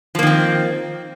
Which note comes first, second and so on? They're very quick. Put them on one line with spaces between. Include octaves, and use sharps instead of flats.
F3 A#3 D#3 C4